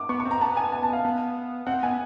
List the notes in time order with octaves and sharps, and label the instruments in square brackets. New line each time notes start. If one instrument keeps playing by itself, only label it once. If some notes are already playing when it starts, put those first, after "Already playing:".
Already playing: [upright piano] D6
[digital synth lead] B3 [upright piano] C#6
[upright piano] C#6
[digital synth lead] C4
[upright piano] A#5
[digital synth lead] B3 [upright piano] A5
[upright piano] G#5
A5
A5
F5
[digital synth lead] B3
[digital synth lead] C4 [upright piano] F#5
[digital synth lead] B3 [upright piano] G#5